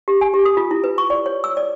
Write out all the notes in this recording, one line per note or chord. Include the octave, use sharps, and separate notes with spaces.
G4
G#5
G4
D#6
F4
E4
B4
C#6
D5
C#5
E6
D5